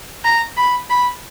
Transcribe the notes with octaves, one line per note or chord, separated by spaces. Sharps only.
A#5
B5
B5